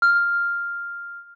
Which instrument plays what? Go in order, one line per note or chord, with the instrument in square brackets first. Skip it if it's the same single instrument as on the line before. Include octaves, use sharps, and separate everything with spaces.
[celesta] F6